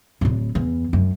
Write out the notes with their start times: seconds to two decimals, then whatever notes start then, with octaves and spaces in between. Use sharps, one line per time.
0.21 D1 A2
0.55 E2
0.93 F#2